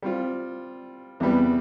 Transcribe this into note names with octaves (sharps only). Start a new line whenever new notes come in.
G3 C4 F4
E2 C3 G3 B3